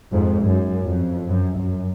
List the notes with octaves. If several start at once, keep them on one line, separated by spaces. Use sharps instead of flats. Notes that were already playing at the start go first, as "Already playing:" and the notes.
F2 G#2
F#2
F2
F#2
F#2